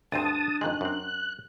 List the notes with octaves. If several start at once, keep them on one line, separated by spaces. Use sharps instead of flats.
D2 G2 C4 D4 A5 D#6
F2 D#3 G#3 F#6
F#2 C4